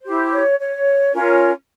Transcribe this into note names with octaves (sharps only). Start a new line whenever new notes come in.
E4 G4 C5
C#5
C#5
C#4 F4 A#4 C#5